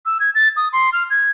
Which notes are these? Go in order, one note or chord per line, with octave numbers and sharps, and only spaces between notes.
E6
G#6
A6
D#6
C6
F6
G#6